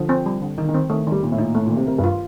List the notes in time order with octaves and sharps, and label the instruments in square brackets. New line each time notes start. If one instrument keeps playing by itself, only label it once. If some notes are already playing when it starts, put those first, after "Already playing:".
Already playing: [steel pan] D3 [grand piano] F3
[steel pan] C4
G3
D3
[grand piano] D#3 [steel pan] D#4
[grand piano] D#3
[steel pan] C4
[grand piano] D#3 [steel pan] A3
[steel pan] D#3 [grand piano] G3
[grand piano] A#2 [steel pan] D#3
[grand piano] A2
[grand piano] A#2 [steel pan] D#4
[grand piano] A2 [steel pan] A3
[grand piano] A#2
[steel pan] D#3
[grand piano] C3
[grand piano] C3 [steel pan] A#4
[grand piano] G2
[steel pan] F4